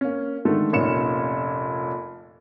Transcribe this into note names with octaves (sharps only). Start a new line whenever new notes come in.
A#3 C#4
D3 D#3 G#3 A3 A4
F1 A#2 C#4 C#7 E7